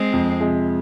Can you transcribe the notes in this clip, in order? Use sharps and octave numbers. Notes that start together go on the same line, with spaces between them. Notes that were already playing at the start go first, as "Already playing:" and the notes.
Already playing: G#3 C4
F2
C3 F3 G#3